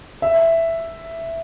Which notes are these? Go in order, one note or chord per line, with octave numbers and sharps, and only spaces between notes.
E5